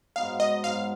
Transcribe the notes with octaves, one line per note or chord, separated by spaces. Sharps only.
G#2 F#3 B3 D#4 F5
D#5
G#2 F#3 B3 D#4 F5